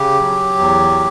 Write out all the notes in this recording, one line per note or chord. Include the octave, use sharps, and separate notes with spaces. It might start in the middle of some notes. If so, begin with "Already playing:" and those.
Already playing: C#3 G4
F#3
E2